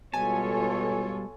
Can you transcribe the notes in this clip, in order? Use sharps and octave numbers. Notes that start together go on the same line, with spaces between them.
B2 G3 G#3 F4 A4 C#5 G#5 A5